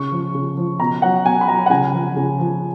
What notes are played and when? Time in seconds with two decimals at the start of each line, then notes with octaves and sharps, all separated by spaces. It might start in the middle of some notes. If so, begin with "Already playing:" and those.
Already playing: C#3 C#6
0.12 F3
0.35 C#3
0.57 F3
0.79 B2 A#5
1.02 F#3 F#5
1.25 B2 G#5
1.41 B5
1.48 F#3 A#5
1.66 F#5
1.70 C#3 G#5
1.93 F3
2.16 C#3
2.39 F3